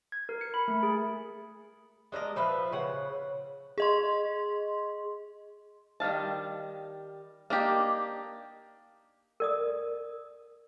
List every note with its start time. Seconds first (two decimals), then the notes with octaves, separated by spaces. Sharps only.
0.12 G#6
0.29 A#4
0.41 C#7
0.54 B5
0.68 A3
0.83 G#4
2.12 G#3 D4 A#4 D#5
2.36 F3 B4 E5 F5
2.72 C#3 F#5
3.78 G#4 D#5 C6
6.00 D#3 G3 F5 A5
7.50 A#3 D4 D#4 G4
9.40 A#4 D5 D#6